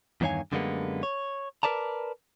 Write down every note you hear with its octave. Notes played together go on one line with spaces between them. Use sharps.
E2 G2 D#3 C#5 F5 G#5
F#2 D3 G3 G#3 A#3 B3
C#5
A#4 B4 D5 A5 A#5